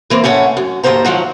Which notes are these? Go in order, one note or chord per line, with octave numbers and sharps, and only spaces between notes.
E3 A#3 C4
A2 A3 C#4 C#5 F#5
F#2
D#2 A2 G#3 C5 A#5
D#3 F3 F#3 F#4